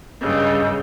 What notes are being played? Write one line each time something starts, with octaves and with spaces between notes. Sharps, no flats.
G2 C#3 D#5 E6 G6